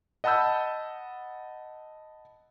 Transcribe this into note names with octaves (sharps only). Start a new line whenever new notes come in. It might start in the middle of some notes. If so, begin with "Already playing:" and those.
D#5 F#5 A5 B5 E6 G6